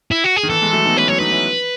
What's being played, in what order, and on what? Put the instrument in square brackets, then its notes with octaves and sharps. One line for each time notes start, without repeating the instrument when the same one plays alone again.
[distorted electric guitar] E4
F#4
G#4
[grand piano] D#3
[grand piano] E3 [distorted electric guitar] A4
[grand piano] E3 G#3
F#3 A3
B3 D#4
[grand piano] A3 C#4 [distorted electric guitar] B4
[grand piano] F#3 A3 [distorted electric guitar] C#5
[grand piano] B3 D#4 [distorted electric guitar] B4
[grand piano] C#4 E4